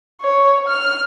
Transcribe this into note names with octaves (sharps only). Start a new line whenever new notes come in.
C#5
F6